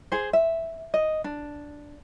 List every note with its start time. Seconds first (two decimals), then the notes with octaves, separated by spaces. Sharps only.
0.12 G#4 C5
0.33 E5
0.94 D#5
1.24 D4